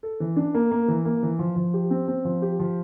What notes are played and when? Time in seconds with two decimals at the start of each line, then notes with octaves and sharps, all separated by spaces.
0.03 A4
0.20 E3
0.36 D4
0.54 A#3
0.71 A#3
0.88 E3
1.05 A#3
1.23 E3
1.39 F3
1.56 F3
1.74 G4
1.90 C4
2.08 C4
2.25 F3
2.42 G4
2.60 F3